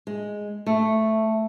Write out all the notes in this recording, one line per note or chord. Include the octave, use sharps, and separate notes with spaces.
G#3
A3